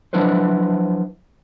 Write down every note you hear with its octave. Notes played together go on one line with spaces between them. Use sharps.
F3 F#3 D4 E4 B4 C5